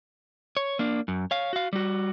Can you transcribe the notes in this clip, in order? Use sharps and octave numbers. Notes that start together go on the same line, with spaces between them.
C#5
A#3 D4
F#2
C#5 F5
F#4 F5
G3 F#4